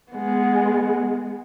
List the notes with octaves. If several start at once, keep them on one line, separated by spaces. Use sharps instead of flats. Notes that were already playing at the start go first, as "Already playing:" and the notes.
G#3 B3